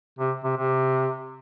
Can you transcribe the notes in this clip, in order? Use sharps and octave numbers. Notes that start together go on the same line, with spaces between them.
C3
C3
C3